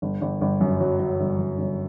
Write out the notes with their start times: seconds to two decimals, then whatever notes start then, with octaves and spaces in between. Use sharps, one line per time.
0.02 G1
0.21 G1
0.41 G1
0.61 F#2
0.81 F#3
1.00 F#3
1.20 G1
1.39 F#3
1.58 G1